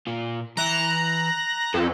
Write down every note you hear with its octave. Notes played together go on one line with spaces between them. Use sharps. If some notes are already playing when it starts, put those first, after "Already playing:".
A#2 F4
E3 E5 A#5 F#6
F2 A4